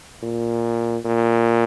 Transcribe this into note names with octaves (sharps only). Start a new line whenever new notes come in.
A#2
A#2